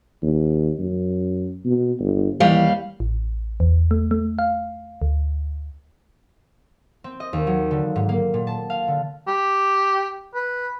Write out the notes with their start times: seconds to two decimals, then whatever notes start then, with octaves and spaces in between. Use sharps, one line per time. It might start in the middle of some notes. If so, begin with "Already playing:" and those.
0.22 D#2
0.79 F#2
1.65 B2
2.00 G1
2.40 D#2 E3 G3 F5
3.00 A1
3.60 E2
3.91 A3
4.11 A3
4.39 F5
5.02 D2
7.04 C4
7.20 D#5
7.33 D#2
7.47 F#3
7.71 D3
7.96 G#2
8.09 A#3
8.34 A#2
8.47 A5
8.70 F5
8.88 D3
9.27 G4
10.34 B4